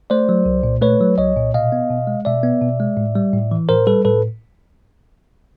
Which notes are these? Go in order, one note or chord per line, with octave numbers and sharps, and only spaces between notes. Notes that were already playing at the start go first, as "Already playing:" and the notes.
A3 C5 D5
F#3
C2
A#2
A3 B4 C#5
F#3
C2 C#5 D#5
A#2
B2 D#5 F5
B3
B2
G#3
B2 D5 E5
B3
B2
G#3
A2
G3
A2
E3
A2 A#4 C5
G3 A4 B4
A2 A4 B4